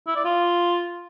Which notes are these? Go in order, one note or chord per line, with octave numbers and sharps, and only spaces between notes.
E4
D5
F4